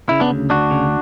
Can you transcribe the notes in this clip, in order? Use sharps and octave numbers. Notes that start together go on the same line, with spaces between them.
C#3 E4
B3 D4
D2
D2 D4 F#4
C#3